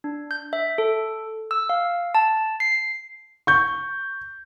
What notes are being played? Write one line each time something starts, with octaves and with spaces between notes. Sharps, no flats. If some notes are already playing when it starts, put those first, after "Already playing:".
D4
G6
E5
A4
E6
F5
A5
C7
C#6 G6